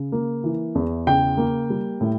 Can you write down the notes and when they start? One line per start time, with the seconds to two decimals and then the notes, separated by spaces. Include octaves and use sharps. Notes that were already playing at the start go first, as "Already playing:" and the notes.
Already playing: C#3
0.12 A#3
0.44 E3
0.75 E2
1.07 C#3 G5
1.37 A#3
1.70 G3
2.01 A2